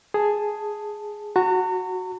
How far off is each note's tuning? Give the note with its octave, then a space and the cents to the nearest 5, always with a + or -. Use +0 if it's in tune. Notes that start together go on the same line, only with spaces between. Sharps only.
G#4 +0 A5 +0
F#4 +0 A#5 -45